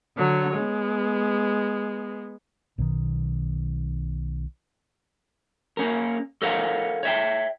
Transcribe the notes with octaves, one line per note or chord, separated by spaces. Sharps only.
D3 F#3 C#5
G#3 B3
B1 B2 D3 D#3
A#3 C#4 A#4
A4 A#4 C#5 F5 F#5 A#5
C#5 E5 G5